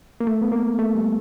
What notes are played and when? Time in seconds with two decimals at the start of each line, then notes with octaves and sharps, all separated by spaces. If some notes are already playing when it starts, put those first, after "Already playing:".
0.20 A#3
0.27 A3
0.42 B3
0.52 A#3
0.79 A3
0.95 G3